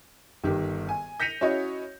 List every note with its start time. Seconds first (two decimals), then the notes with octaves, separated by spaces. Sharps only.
0.44 G1 D#3 G4
0.89 G#5
1.20 G6 A#6 B6 C#7 D#7 F7
1.41 C#4 E4 F#4 C#5 D#5